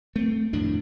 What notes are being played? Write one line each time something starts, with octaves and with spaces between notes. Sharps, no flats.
A3 C4
F2 A2 D#3 D4